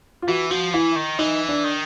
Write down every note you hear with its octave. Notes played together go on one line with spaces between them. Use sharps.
F4
E3 F#4
F3 F#4
E3 E4
D#3
E3 D#4
D4
D#3